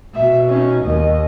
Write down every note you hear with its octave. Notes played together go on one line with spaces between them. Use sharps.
B2 E5
C#4 D#4
D#2 D#5